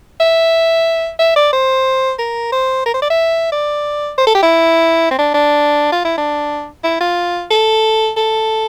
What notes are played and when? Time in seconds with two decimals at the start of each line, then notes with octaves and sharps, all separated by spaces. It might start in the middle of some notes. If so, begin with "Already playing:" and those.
0.20 E5
1.19 E5
1.36 D5
1.53 C5
2.19 A#4
2.52 C5
2.86 A#4
2.94 C5
3.02 D5
3.10 E5
3.52 D5
4.18 C5
4.27 A4
4.35 G4
4.43 E4
5.11 C4
5.19 D4
5.34 D4
5.92 F4
6.05 E4
6.18 D4
6.84 E4
7.01 F4
7.51 A4
8.17 A4